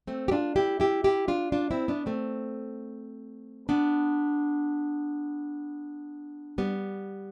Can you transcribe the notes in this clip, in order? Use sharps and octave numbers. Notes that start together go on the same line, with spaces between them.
A3 C4
G4
D4 F4
E4 G4
E4 G4
E4 G4
D4 F4
D4 F4
C4 E4
B3 D4
A3 C4
B3 D4
G3 B3